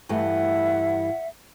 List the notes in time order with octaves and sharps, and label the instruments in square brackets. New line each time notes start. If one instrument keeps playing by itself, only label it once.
[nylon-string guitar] G2 E3 A3 [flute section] E5 F#5